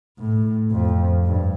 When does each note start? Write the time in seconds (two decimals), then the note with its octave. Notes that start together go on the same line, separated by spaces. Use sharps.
0.18 A2
0.71 F2
1.24 G2